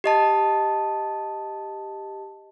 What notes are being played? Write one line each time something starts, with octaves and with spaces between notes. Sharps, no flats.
G4 D#5 A5